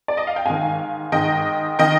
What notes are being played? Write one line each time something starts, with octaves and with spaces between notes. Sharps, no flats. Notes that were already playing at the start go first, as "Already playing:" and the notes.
D5
D#5
F5
G5
G#2 D#3 F5 G#5
G#2 D#3 D#5 G5
D#3 D#5 G5